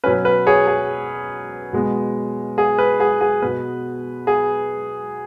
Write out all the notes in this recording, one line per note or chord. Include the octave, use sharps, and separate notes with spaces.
B2 F#3 C#4 B4
B4
G#4 C#5
G#4
B2 G#3 B3
G#4
B4
G#4
G#4
B2 B3 B4
G#4